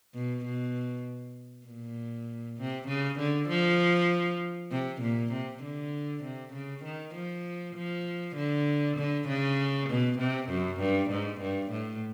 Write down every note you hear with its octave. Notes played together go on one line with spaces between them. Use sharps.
B2
B2
A#2
C3
C#3
D3
F3
C3
A#2
C3
D3
C3
C#3
D#3
F3
F3
D3
D3
C#3
B2
C3
F#2
G2
G#2
G2
A2